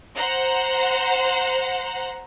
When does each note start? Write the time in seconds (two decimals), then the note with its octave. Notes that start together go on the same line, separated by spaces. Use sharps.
0.15 C5 F#5 A#5